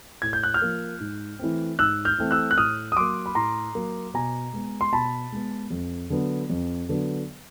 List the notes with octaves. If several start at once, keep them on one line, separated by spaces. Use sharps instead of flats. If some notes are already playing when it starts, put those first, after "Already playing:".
A2 G#6
G6
F#6
F6 G6
F3 A#3
G#2
E3 A3 C4
G#2 E6 F#6
F6 G6
E3 A3 C4
E6 F#6
F#6
A2 D#6 F6
D#6
F#3 A#3 C6 D6
B5
A2 A#5 C6
F#3 A#3
B2 G#5 A#5
G#3 B3
C6
B2 A5 B5
G#3 B3
F2
D3 F#3 B3
F2
D3 F#3 B3